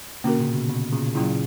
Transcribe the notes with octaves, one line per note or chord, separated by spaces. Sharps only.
B2 D3 A#3 C#4 F#4 A#4
A#2 C#3
B2
B2
A#2 C#3
A#2 C#3 F#3 A#3 E4